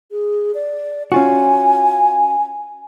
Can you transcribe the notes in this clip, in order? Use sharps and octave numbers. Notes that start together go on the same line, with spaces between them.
G#4
D5
C#4 F4 F#4 G#5